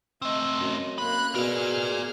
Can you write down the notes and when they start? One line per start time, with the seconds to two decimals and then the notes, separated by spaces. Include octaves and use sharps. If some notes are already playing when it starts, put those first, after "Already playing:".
0.22 A3 C4 D#5
0.61 F#2
0.98 A#3 B5 F#6
1.35 B2 G#4 A#4 D5 F6